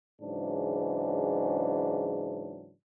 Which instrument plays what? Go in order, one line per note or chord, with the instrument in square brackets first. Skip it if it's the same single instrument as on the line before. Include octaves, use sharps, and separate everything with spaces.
[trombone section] G#2 C#3 E3 F#3 D4